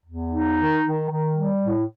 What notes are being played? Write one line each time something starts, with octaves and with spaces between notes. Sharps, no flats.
E2
D#4
D#3
D#3
D#3
G3
A2